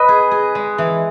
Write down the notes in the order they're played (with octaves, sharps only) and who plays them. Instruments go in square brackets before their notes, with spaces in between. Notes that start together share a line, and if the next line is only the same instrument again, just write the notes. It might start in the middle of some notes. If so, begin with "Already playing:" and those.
Already playing: [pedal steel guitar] B4 D#5
[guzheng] G#4
G#4
G#3
E3